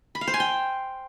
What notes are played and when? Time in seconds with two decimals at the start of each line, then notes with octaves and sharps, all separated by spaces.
0.15 B5
0.21 F5
0.27 C5
0.34 G#5
0.40 G5